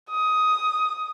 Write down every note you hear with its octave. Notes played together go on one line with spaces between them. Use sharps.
D#6